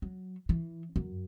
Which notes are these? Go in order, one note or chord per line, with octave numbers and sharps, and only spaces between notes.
F#3
E3
F#2